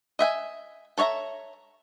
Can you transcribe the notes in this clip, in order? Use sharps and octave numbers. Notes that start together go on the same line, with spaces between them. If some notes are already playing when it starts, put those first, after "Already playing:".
D#5 E5 G5 G#5
A4 C#5 D5 E5 A#5